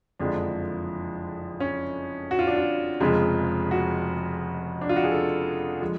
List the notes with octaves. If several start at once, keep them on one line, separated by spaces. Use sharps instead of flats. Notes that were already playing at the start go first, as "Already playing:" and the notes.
F#1 F2 D3 F3 G#3 D4
C#4
F#4
F4
D4
F4
F1 F2 C#3 F3 G#3
F#4
D4
F4
F#4
G#4
A4
F3 G#3